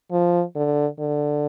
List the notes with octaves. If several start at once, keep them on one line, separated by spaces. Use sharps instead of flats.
F3
D3
D3